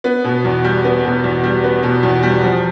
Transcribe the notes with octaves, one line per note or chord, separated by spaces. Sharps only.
B3
B2
E2
G3
B3
B2
E2
G3
B3
B2
E2
G3
F3